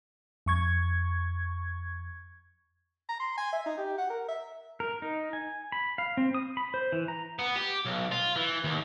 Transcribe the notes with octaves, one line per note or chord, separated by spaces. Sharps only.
F2 C#6 G#6
A#5
C6
G#5
E5
D#4
G4
F#5
A#4
E5
A#4
D#4
G#5
B5
F5
C4
D#6
B5
C5
E3
A#5
B3
G4
B1
F4
E3
D#2